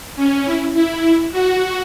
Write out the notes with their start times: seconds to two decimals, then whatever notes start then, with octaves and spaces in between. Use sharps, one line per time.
0.16 C#4
0.45 E4
0.74 E4
1.02 E4
1.31 F#4